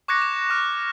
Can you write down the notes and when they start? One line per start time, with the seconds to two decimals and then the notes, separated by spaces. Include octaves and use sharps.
0.08 C#6 D6 F#6 G#6 A#6 C#7
0.22 E7
0.50 C#6 F6